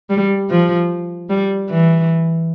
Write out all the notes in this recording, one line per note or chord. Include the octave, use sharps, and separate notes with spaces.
G3
F3
G3
E3